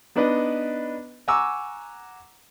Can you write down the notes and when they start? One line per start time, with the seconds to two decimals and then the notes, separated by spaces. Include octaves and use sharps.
0.16 B3 D4 D#4 B4 D5 D#5
1.28 F#5 G#5 A#5 C#6 D6 E6